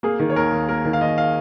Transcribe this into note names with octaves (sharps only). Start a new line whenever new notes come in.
A#3 G#4
D#3
C#5
D#2 A#4
D#2
A#3 A#4
D#3
F5
D#2 D#5
F5